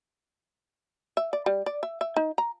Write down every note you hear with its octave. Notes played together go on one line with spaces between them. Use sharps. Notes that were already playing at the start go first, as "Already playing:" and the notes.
E5
D5
G3
D5
E5
E5
D#4
A#5